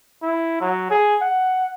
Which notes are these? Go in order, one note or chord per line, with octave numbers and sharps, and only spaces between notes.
E4
F#3
G#4
F#5